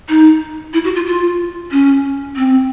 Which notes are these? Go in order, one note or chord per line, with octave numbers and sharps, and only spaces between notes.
D#4
E4
F#4
F4
F4
C#4
C4